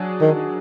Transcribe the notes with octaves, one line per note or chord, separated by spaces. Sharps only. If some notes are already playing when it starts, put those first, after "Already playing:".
Already playing: F#3 D4 G#4
D#3